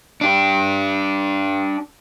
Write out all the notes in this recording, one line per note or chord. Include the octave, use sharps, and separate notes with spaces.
D4 G4